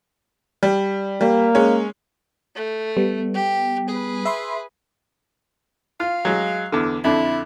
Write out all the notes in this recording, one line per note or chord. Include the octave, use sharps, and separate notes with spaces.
G3
G3 A#3
G#3 C#4
A3
G3 B3
G4
G#4 B4
E5 B5 C6
F4 F5
F#3 G#3
E2 D3
F2 D3 D4 E4